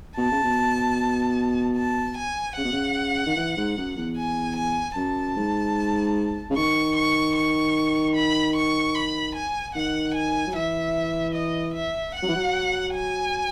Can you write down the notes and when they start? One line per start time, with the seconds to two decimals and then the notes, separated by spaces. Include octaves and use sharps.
0.18 B2 A5
0.31 C#3
0.43 B2
1.77 A5
2.17 G#5
2.57 C#3 F#5
2.64 B2
2.72 C#3
3.26 D#3
3.36 E3
3.57 G#2
3.77 F#2
3.97 E2
4.17 G#5
4.56 G#5
4.96 F#2 A5
5.36 G#2
6.50 C#3
6.56 D#3 C#6
6.96 C#6
7.36 C#6
8.16 B5
8.56 C#6
8.95 B5
9.35 G#5
9.75 D#3 F#5
10.14 G#5
10.47 F#3
10.54 E3 E5
11.35 D#5
11.74 E5
12.15 F#5
12.22 F#3
12.28 E3
12.36 F#3
12.94 G#5